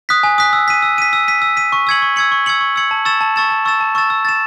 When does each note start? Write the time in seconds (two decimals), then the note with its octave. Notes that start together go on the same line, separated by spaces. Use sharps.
0.09 D#6 F#6 B6
0.23 G#5
0.38 D#6 F#6 B6
0.53 E6
0.68 B6 D#7
0.82 E6
0.98 B6 D#7
1.13 E6
1.28 B6 D#7
1.42 E6
1.57 B6 D#7
1.72 C#6
1.87 E6 G#6 C#7 F#7
2.02 C#6
2.16 E6 G#6 C#7 F#7
2.32 C#6
2.46 E6 G#6 C#7 F#7
2.61 C#6
2.76 E6 G#6 C#7 F#7
2.91 A5
3.05 C#6 E6 A6 E7
3.21 A5
3.36 C#6 E6 A6 E7
3.51 A5
3.65 C#6 E6 A6 E7
3.80 A5
3.95 C#6 E6 A6 E7
4.10 E6
4.25 A6 E7